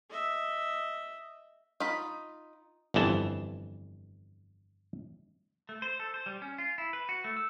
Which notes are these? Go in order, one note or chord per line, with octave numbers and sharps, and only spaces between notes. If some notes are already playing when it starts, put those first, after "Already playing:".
D#5 E5
D#4 F4 B5
G1 F2 E3 A5
A3
C5
A4
C5
G3
C#4
F4
E4
B4
F#4
A3
E6